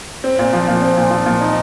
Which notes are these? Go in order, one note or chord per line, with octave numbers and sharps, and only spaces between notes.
C4
A#2
F3
A#2
C4
A#2
F3
A#2
D#4